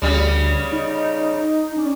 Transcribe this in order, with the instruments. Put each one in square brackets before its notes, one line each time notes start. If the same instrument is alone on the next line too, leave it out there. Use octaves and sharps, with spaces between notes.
[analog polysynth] D2 [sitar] C#3 G3
[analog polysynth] D#4
C#4 D5